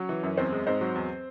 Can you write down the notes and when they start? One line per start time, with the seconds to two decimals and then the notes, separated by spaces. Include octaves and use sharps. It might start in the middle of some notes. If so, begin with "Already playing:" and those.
Already playing: F#3 C#4 C#5
0.09 E3
0.23 F#2
0.37 E2 C4 C5
0.52 G#3
0.67 G#2 C4 C5
0.81 F#3
0.95 E2